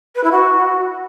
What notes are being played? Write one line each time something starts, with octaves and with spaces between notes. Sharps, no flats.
B4
E4
F#4